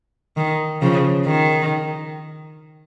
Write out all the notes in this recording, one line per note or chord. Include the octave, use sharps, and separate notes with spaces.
D#3
C#3 F3
D#3